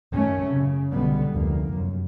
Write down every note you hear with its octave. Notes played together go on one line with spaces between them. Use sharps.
F#2 D#3 A3 C#4
C#3
B1 B2 D3 G3 B3
F1 D2 A#3
F#2